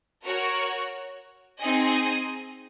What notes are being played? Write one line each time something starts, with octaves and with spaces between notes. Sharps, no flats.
F#4 A#4 C#5
C4 D#4 G#4 D#5 G#5